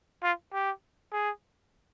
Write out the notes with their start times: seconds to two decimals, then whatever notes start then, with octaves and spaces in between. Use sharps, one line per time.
0.23 F4
0.53 G4
1.12 G#4